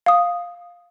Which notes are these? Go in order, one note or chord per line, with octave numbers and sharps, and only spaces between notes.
F5 D#6